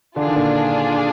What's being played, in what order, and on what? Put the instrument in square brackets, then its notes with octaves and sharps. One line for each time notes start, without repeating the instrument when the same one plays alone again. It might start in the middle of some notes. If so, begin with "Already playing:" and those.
[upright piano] D3 [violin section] D4 F4 G#4
[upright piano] D#3
A#2 D3